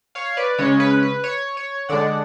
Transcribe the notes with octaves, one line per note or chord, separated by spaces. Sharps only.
C#5 F5
B4 D5
C#3 G#3 C#4 C#5
B4
B4
C#5
C#5
D3 G#3 D4 D5 F#5